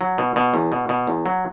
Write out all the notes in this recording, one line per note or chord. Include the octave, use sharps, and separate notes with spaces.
F#3
B2
B2
E2
B2
B2
E2
F#3